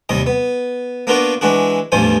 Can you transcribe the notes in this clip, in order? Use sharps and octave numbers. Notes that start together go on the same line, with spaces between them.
D#2 C3 G3 D#5
B3
A#3 B3 D4 F4 F#4 A#4
E3 G#3 D4 F#4
A1 E2 G2 F3 C5 G#5